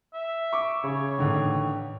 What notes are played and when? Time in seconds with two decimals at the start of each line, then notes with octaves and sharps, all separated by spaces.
0.13 E5
0.53 C#6 D6
0.84 C#3 C#5
1.18 A1 D3 D#3